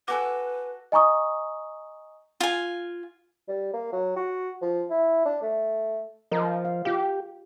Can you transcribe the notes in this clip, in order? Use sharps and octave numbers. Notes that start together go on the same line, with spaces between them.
F#4 G4 A4 B4 G#5 D6
D#5 G#5 A#5 C#6 D#6
F4 G#5
G3
A#3
F#3
F#4
F3
E4
D4
A3
F3 A#4 D#5
F5
F4 G4 F5 G5